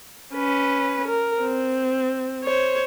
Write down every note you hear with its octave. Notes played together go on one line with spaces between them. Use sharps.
C#4 B4
A#4
C4
C5 C#5